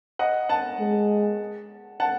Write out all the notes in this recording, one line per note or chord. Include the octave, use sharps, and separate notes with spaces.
D#5 F#5
F#5 A5
G#3
F#5 A5